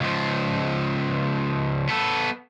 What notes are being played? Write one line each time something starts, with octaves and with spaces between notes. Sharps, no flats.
C#2 F3
B3 A4